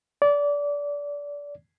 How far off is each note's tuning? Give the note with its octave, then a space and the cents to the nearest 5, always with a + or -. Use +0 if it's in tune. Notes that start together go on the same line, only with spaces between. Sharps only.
D5 -25